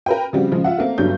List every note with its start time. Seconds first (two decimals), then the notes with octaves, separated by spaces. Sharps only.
0.06 A#4 B4 G5
0.33 C#3 F3 G3 C4 F#4
0.52 C#3 F3 G#3
0.64 F4 E5 F#5
0.78 A3 A#3 C4
0.98 G1 G2 D3 F#3 G3 G6